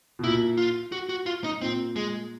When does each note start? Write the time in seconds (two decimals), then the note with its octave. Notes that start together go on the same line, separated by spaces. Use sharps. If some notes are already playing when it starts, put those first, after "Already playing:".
0.19 B2
0.24 A#2 E4
0.58 F4
0.92 F#4
1.09 F#4
1.26 F4
1.44 D#4
1.61 A#2 C4
1.96 G#3